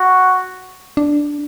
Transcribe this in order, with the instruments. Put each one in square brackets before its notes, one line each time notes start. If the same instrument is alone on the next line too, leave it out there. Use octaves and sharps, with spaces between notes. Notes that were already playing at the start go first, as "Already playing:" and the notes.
Already playing: [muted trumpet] F#4
[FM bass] D4